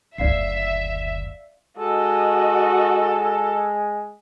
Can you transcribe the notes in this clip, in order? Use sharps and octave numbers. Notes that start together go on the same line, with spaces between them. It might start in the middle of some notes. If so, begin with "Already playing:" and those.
F#1 D2 D5 E5 F5 C7
G#3 F#4 A4 D#5